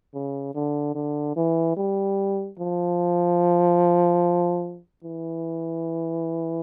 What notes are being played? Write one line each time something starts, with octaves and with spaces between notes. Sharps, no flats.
C#3
D3
D3
E3
G3
F3
E3